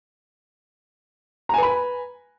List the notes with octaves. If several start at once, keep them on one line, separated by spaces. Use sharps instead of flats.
B4 G#5 A#5 B5